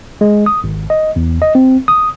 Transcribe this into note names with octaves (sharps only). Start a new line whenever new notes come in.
G#3
D#6
G#1
D#5
E2
D#5
C4
D#6